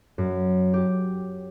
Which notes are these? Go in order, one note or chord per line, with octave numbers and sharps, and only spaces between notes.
F#2
G4